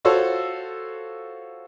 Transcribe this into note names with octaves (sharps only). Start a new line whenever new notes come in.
F4 F#4 A4 C5 C#5